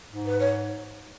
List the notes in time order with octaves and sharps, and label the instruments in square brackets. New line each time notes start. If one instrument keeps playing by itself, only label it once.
[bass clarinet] G#2
[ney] B4
C#5